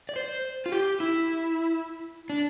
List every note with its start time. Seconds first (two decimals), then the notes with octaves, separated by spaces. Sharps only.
0.09 D5
0.16 C5
0.66 F4
0.72 G4
1.00 E4
2.30 D4